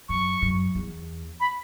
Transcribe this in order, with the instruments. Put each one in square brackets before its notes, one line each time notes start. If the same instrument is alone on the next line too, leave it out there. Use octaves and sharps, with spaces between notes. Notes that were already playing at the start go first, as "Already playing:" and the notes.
[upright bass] F#2 [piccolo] C#6
[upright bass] F#2
E2
[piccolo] B5